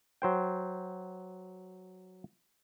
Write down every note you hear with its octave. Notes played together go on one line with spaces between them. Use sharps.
F#3 C5 G5